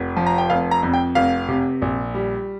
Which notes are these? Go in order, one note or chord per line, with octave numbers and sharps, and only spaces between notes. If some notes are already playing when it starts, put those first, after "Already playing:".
Already playing: F1
F3
A#5
G5
F1 F5
A#5
F2
G5
F1 F5
C3
A#1
G3